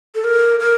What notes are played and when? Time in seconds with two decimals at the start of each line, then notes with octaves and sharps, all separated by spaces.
0.15 A4
0.24 A#4
0.60 A#4